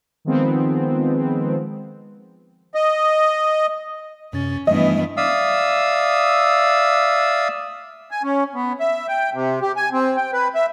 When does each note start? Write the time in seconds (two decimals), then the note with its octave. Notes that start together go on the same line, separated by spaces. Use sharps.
0.25 D#3 F3 G#3 B3 C4
2.74 D#5
4.33 F#2 C3 C#4 A6
4.67 G2 E3 F3 G3 A3 B3 D#5
5.17 D5 E5 F5 D#6 E6
8.11 G#5
8.23 C#4
8.55 B3
8.80 E5
9.08 G5
9.34 C3
9.62 G4
9.76 G#5
9.93 C4
10.17 G5
10.33 B4
10.55 E5